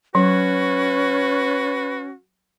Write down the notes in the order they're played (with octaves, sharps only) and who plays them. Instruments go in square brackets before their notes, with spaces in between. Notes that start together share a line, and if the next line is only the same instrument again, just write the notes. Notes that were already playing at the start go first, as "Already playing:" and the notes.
[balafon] F#3 [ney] C#4 [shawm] F#4 [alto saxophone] B4